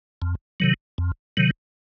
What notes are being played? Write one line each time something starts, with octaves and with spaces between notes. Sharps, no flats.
F2
C3 D#3 F#3
F2
C3 D#3 F#3